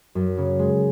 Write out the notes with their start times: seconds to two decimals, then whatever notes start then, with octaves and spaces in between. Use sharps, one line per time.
0.15 F#2
0.37 C#3
0.59 G#3